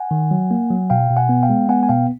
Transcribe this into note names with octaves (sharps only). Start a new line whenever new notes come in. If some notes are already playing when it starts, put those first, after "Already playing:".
Already playing: F#5 G#5
D#3
F#3
A#3
F#3
B2 F5 G5
B2
F#5 G#5
B3
F5 G5
G#3
B3 F#5 G#5
G#5
B2 F5 G5